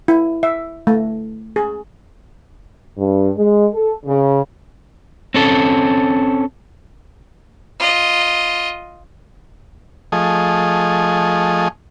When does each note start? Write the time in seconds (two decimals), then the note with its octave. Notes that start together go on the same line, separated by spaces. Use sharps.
0.08 E4
0.43 E5
0.87 A3
1.56 G#4
2.97 G2
3.37 G#3
3.73 A4
4.06 C#3
5.34 C4 C#4 A4
7.80 F4 D#5
10.12 F3 A3 G#4 D#5